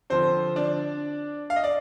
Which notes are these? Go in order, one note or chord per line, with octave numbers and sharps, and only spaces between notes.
D3 F3 C4 C5
D4 D5
F5
D#5
D5